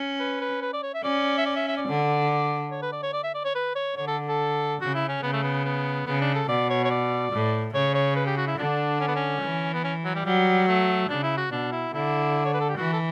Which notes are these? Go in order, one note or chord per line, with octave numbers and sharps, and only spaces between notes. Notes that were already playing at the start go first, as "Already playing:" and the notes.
Already playing: C#4
B4
B4
B4
D5
C#5
E5
C#4 D5
E5
D5
E5
E5
D5
D3
C#5
B4
D5
C#5
D5
E5
D5
C#5
B4
C#5
D3 C#5
A4
A4
C#3 F#4
E4
C#4
C#3 B3
A3
B3
B3
C#3 B3
D4
A4
B2 D5
C#5
C#5
D5
A2
C#3 C#5
C#5
B4
G4
F#4
E4
D3 D4
C#4
B3
C#4
E3
B3
C#4
F#3
G3
F#3 G3
A3
C#3 D4
E4
F#4
B2 D4
E4
D3 E4
C#5
B4
A4
G4
E3 F#4
A4